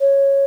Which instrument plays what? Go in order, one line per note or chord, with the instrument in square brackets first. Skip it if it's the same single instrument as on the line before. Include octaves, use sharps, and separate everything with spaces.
[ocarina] C#5